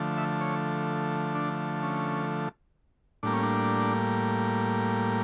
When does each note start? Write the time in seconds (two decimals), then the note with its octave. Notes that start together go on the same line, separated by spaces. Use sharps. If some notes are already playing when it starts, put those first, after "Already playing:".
Already playing: D3 F3 A3
0.17 E5
0.41 C#5
1.35 D4
1.83 C#4
3.23 A2 G3 A#3 D4
3.33 C#4
3.43 D4